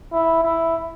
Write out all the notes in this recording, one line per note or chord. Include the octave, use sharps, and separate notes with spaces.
E4
E4